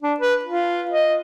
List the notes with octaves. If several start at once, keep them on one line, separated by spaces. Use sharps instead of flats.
D4
B4
F4
D#5